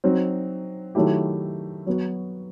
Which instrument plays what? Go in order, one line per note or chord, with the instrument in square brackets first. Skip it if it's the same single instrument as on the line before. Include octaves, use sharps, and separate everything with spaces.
[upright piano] F#3 C4 D#4
D#3 F#3 A3 E4 G4
F#3 B3 F#4